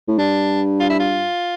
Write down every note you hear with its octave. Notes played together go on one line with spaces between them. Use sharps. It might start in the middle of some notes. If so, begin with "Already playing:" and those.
A2
G2 D4
F4
E4
F4